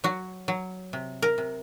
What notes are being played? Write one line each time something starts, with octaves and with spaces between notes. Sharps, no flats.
F#3 F#4
F#3
C3
A#4
C3